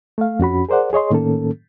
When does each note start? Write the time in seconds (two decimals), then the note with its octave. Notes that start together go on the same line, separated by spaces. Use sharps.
0.18 A3 F5
0.39 F2 C#4 F#4 B5
0.69 G#4 A#4 C5 D5 F#5
0.93 G#4 C#5 D#5 C6
1.11 A2 D#3 A#3 C#4 A4